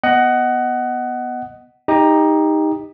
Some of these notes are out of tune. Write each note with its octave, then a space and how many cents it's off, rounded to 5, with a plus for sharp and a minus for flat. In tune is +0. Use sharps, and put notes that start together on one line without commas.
B3 +0 D#5 +0 F#5 +15
D#4 +5 G4 +25